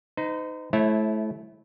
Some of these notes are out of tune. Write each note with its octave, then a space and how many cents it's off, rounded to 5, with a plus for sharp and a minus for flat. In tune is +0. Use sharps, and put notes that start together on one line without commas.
D#4 +0 C5 -45
A3 -30 E4 +0 C#5 -40